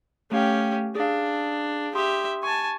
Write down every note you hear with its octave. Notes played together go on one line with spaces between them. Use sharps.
A3 C#4 G4 F5 G5
D4 G#4 F5
G4 E5 C6 D#6
G#5 A5 C#6